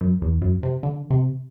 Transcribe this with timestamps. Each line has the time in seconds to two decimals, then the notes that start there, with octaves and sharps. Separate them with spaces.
0.01 F#2
0.22 E2
0.42 F#2
0.63 C3
0.83 D3
1.11 C3